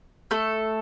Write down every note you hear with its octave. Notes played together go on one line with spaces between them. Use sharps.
A3 A4